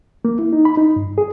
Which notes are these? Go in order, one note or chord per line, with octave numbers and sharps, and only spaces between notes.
A#3
E4
D#4
B5
D#4
G2
G#4